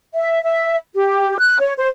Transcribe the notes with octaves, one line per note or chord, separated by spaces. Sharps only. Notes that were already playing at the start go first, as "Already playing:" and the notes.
E5
E5
G4
F#6
C#5
C5